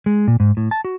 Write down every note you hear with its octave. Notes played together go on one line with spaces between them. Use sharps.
G#3
A#2
G#2
A2
A5
F#4